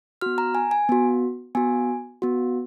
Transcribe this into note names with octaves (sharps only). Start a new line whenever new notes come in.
B3 F#4 F6
A#5
G#5
G#5
B3 F#4
B3 F#4 G#5
B3 F#4